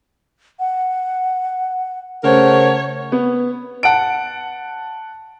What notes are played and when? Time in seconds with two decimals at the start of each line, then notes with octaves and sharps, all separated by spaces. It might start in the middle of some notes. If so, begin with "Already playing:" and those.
0.59 F#5
2.24 C#3 A3 A#4 C5 C#5 F#5
3.12 B3
3.83 F#5 A5 D7